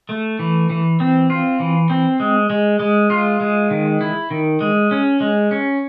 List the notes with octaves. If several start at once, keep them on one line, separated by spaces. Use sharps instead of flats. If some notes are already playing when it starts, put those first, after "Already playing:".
A3
E3
E3
C4
F4
E3
C4
G#3
G#3
G#3
F4
G#3
D#3
E4
D#3
G#3
C#4
G#3
C#4